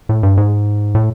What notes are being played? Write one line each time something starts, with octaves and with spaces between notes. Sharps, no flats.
A2
G2
G#2
A2